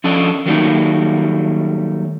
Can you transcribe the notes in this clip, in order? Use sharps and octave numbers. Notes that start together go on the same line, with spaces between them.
F3 C#4 D4 A4 D#5
D#3 F#3 G3 A3 A#3 D#4